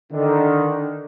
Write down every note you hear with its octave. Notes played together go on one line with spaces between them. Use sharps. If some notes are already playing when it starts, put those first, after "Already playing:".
D3 D#3